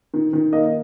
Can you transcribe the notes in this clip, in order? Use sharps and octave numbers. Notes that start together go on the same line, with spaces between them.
D#3
D#3
A#3 D#5